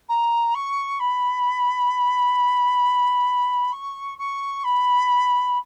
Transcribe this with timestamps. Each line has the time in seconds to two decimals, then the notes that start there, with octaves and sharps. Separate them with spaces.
0.08 A#5
0.54 C#6
0.99 B5
3.72 C#6
4.18 C#6
4.64 B5